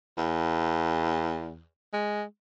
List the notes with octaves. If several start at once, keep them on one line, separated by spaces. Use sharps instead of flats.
E2
G#3